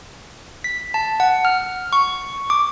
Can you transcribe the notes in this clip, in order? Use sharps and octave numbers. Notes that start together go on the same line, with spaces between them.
B6
A5
F#5
F6
C#6
D6